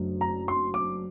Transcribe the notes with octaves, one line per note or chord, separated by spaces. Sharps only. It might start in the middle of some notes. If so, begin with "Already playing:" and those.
Already playing: F#1 F#2 F#3 A3 D4
A#5
C6
D6